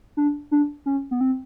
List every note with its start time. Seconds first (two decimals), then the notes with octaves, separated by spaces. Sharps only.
0.17 D4
0.51 D4
0.86 C#4
1.11 B3
1.21 C4